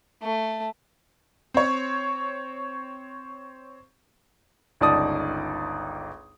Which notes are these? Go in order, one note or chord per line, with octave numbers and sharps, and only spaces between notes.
A3
C4 C#5
G1 C#2 D#4 D5 A5 D#6